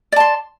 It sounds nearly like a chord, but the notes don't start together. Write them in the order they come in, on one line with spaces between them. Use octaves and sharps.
D5 A5 C6